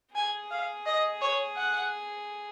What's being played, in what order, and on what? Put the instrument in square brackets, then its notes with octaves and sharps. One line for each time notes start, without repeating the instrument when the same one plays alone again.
[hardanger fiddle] G#4 [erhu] G#5
[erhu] F5
D#5
C#5
F#5